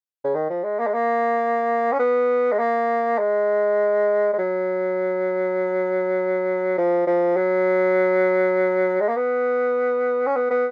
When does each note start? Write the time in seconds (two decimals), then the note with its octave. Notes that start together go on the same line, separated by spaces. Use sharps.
0.24 C#3
0.35 D#3
0.50 F3
0.64 G#3
0.79 A#3
0.87 G#3
0.94 A#3
1.92 C#4
1.99 B3
2.52 G#3
2.59 A#3
3.19 G#3
4.33 G#3
4.38 F#3
6.78 F3
7.07 F3
7.36 F#3
9.00 G#3
9.09 A#3
9.16 B3
10.27 C#4
10.36 B3
10.51 B3